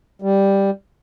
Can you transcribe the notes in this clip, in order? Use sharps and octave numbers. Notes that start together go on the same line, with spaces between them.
G3